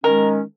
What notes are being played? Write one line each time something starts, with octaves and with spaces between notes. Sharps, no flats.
D#3 G#3 C#4 A#4